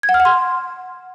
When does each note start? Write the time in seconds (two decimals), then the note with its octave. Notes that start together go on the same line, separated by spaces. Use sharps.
0.03 G#6
0.09 F#5
0.14 F6
0.20 F#5
0.25 C6